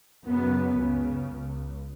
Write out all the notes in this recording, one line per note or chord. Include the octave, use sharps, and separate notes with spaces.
F#2 C#3 B3
C#2 C#3
C#2